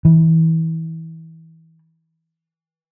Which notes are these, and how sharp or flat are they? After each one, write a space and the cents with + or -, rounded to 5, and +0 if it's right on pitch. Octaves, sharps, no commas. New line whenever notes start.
E3 -25